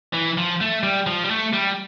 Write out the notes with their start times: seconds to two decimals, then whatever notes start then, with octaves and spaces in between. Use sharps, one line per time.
0.13 E3
0.38 F3
0.61 A3
0.83 G3
1.07 F3
1.24 G3
1.30 A3
1.53 G3